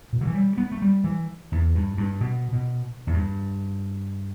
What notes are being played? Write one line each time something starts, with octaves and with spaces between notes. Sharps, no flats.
B2
D3
E3
G3
B3
A3
G3
E3
E2
G2
G2
B2
B2
E2
G2